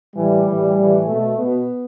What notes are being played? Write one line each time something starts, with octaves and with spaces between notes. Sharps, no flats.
A2 E3 G3
A2 E3
A2 E3
B2 A3
B2 B3